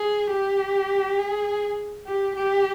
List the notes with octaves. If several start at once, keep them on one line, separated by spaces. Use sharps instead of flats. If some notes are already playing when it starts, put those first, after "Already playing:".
Already playing: G#4
G4
G#4
G4
G4